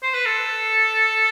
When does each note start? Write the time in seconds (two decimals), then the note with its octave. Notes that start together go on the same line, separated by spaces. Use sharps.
0.02 C5
0.14 B4
0.26 A4